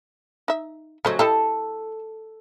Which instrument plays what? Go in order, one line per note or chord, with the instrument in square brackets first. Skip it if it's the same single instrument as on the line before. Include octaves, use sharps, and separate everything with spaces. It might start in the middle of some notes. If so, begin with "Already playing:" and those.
[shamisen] D#4 E5
[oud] C#3 F#3 [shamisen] A3 C5 D#5
[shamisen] E4 G4 D#5 [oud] A4